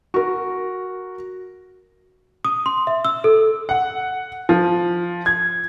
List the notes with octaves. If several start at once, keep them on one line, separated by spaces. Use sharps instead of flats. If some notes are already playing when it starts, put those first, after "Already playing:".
F#4 A#4
D#6
C6
E5
E6
A4
F#5
F3
G#6